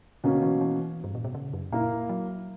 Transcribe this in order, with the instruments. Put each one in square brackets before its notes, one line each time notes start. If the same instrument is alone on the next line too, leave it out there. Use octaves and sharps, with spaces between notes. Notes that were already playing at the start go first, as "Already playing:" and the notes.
[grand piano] B2 A#3 C#4 [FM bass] D3
[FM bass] E3
E3
G2
A#2
B2
C#3
F#2
[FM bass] A#2 [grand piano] A#3 E4 A#4
[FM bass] F#3